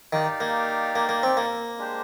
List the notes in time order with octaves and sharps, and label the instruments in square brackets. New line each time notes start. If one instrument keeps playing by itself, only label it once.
[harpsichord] D#3 [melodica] D#4 G4 D5 F5
[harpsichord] A#3
A#3
A#3
C4
A#3
[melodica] G#3 D4 G4 C5